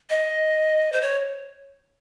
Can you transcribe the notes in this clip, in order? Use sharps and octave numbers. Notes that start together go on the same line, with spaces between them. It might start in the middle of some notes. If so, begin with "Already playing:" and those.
D#5
C5
C#5